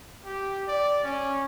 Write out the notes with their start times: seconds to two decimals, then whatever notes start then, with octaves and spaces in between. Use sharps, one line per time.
0.25 G4
0.68 D5
1.04 C#4